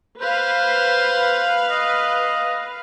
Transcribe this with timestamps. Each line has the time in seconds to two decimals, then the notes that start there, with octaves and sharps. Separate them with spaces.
0.22 B4 C5 F5
1.70 D#5